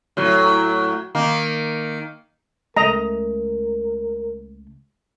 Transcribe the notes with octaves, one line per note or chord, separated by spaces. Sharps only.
A2 F#3
D#3 A#3
C#2 A3 A#4 D#5 A#5